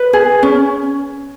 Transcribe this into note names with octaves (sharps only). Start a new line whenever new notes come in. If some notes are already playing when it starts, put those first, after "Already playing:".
Already playing: B4
G#4
C#4